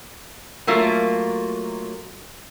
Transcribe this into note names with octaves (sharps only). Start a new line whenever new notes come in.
F#3 A3 A#3 F4